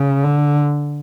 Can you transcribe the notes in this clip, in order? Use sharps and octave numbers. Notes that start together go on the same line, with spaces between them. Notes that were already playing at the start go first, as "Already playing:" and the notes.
Already playing: C#3
D3